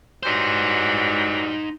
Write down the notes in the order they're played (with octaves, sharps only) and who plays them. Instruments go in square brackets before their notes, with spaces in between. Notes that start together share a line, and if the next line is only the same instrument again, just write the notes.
[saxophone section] E3 F#3 G3 [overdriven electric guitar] D#4 C5